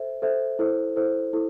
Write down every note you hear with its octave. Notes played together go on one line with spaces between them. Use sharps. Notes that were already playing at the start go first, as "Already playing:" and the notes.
Already playing: A4 C5 E5
A4 C5 E5
E4 A4 C5
E4 A4 C5
E4 A4